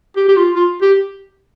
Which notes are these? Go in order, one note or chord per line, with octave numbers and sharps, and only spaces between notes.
G4
G4
F4
F4
G4